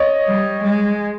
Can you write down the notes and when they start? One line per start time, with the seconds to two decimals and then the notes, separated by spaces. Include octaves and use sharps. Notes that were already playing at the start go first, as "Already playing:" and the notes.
Already playing: C#5 D#5
0.27 G3
0.64 G#3